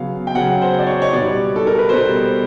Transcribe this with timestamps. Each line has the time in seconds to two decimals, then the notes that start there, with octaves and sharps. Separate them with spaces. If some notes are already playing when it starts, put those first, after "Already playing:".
Already playing: C#3 F#3 B3 F5
0.27 G5
0.35 C#3 F#3 B3 F#5
0.61 C5
0.78 D5
0.87 C#5
1.02 C#5
1.13 B2 G3 B3 D5
1.56 A4
1.67 A#4
1.78 B4
1.89 B2 G3 B3 C5